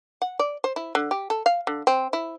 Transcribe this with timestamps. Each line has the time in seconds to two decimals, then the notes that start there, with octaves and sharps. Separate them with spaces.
0.22 F#5
0.39 D5
0.64 C5
0.76 E4
0.95 D3
1.11 G4
1.30 A4
1.46 F5
1.67 D3
1.87 C4
2.13 E4